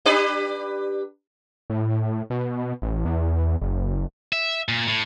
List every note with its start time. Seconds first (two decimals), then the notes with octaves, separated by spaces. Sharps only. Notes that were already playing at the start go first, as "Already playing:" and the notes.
0.06 D4 G4 B4
1.70 A2
2.30 B2
2.82 A1
3.05 E2
3.61 F#1
4.33 E5
4.69 A#2
4.87 A2